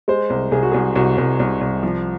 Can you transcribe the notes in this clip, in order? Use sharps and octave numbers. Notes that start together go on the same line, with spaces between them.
G#3 C5
C2
C2 G#4
F#4
C2 G#4
C2 F#4
C2
C2
C2
F3